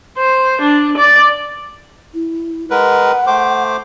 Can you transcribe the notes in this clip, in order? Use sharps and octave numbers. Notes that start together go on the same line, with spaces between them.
C5
D4
D5
E4
G#3 A#4 B4 F#5
A3 C5 D6